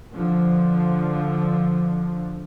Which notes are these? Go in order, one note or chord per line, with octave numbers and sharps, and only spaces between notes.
D3 F3